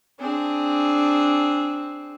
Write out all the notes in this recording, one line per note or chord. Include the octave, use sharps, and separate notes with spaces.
C4 D4 G#4